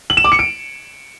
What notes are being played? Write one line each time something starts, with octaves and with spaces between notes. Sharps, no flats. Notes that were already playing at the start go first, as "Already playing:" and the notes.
F#7
E7
D6
C#7
D7